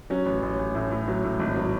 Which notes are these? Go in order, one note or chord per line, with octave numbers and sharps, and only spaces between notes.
F#3 C#4
A1
A1
A1
A2
A2
F#3
A2
G#1
F#3